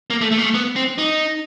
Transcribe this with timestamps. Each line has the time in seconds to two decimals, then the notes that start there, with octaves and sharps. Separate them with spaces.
0.10 A#3
0.21 A3
0.32 A3
0.38 A#3
0.43 A3
0.54 B3
0.76 C4
0.98 D#4